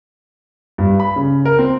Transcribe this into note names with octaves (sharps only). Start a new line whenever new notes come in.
G2
B5
C#3
A#4
C4